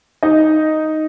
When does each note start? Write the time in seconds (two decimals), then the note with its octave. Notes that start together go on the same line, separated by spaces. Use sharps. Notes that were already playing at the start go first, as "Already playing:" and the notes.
0.23 D#4 D#5